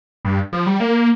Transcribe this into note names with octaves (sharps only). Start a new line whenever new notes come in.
G2
F3
G3
A#3